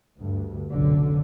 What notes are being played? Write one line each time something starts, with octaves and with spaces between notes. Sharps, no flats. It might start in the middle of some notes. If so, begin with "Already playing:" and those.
D2 G2
F1 B1 F#2 D3